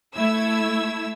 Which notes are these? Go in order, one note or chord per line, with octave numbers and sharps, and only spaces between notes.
A3 E4 E6 G#6